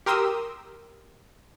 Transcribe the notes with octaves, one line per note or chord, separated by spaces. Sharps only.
G4 A#4 C6 D#6 E6